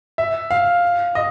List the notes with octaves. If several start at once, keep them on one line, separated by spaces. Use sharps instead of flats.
E5
F5
D#5